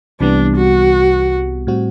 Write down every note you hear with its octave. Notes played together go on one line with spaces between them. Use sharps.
C2 C3 E3 G3 B3 D4
F#4
A2 G3 C4 F#4